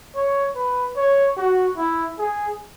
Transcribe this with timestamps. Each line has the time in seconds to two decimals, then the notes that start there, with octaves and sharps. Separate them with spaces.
0.16 C#5
0.56 B4
0.97 C#5
1.37 F#4
1.78 E4
2.19 G#4